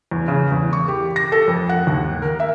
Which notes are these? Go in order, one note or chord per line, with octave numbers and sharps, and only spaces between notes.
E2
C#3
E2
C#6
G4
A#6
A4
F2
F#5
D#2
A#4
E5